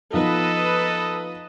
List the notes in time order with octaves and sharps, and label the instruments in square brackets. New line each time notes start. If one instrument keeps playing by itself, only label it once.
[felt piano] F3 B3 D#4 [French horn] A4 [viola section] B4 D#5